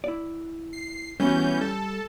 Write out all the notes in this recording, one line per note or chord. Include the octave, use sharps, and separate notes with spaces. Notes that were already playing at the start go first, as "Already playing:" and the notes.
E4 D5
C7
E3 G3 B3 C#4 F#4 G6
G3 A4 A5